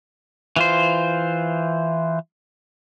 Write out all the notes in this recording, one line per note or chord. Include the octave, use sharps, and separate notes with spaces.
E3 F4 C5